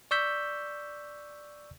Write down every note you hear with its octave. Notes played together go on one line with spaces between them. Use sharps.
D5 C#6 E6 G6 B6